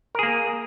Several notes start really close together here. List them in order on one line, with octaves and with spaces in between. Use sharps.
A#4 G#4 A#3